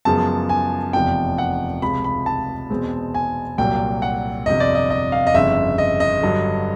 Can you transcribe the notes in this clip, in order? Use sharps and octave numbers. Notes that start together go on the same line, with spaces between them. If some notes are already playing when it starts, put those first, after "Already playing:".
F#2 C#3 F3 G#3 B3 A5
G#5
F1 E2 C3 F3 G5
F#5
C#2 C3 F3 B5
B5
A5
E2 B2 G#3 C4
G#5
C2 A#2 F#3 G5
F#5
G1 F2 C3 D#5
D5
D#5
D#5
F5
D#5
G1 F2 C#3 E5
D#5
D#5
G2 D3 F#3